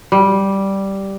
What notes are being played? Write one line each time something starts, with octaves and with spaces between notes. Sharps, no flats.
G3